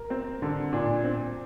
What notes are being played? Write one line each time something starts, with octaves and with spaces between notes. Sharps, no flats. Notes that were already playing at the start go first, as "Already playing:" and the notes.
Already playing: A#4
C4
D3
A#2 D4
C4